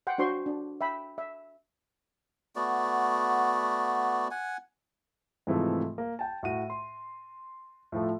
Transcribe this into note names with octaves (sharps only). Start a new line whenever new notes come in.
F#5 G5 C6
D4 F#4 C5 C6 C#6
D4
E5 G5 B5
E5
A3 B3 F#4 D5
F#5 G#5
G#2 C3 E3 F3 A3
A#3
G5 A5
A2 F#4 D#7
C6
A2 F3 A3